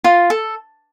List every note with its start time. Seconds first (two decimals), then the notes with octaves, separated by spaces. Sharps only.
0.04 F4
0.30 A4